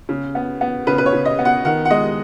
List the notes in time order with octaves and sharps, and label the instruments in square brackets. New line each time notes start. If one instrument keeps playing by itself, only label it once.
[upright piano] C#3
B3
B3
C#3 B4
B4
C#5
C#3
D#5
B3
F#5
D#3 F#5
F#5
G#3 D#5